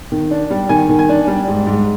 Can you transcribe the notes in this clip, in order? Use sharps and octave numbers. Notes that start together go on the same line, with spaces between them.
D#3
D4
G3
D#3 G#5
D#3
G#5
D4
G3
G#2
G#2